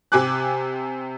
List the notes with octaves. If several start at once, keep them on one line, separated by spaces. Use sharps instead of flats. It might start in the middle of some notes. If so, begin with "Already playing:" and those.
C3 G4 G#5 D6 F#6